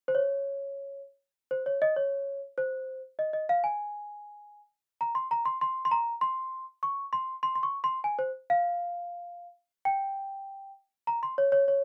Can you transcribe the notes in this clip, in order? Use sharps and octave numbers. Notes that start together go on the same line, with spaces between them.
C5
C#5
C5
C#5
D#5
C#5
C5
D#5
D#5
F5
G#5
A#5
C6
A#5
C6
C6
C6
A#5
C6
C#6
C6
C6
C6
C#6
C6
G#5
C5
F5
G5
A#5
C6
C#5
C#5
C#5